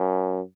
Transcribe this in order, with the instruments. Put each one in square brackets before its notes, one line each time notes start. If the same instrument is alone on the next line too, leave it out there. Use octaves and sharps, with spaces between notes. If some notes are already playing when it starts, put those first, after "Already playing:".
Already playing: [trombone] F#2